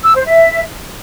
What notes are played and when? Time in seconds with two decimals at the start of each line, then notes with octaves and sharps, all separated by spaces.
0.04 E6
0.16 C5
0.27 E5